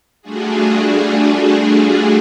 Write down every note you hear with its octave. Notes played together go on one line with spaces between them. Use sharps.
G3 A3 D4 F4 F#4 G#4